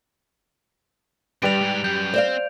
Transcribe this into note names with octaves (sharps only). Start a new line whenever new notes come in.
G2 G3 G4 B4 D7 F7
G#2
F#2 G6
C4 C5 D5 F5